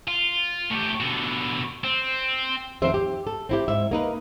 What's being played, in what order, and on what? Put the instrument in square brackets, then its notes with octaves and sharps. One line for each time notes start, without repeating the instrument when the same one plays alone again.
[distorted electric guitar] F4
A2 G4
B2 D3
C4
[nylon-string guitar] F2 D#3 C4 C5 E5
G4
A4
C4 E4 G4
G#2 E5
A#3 D#4 B4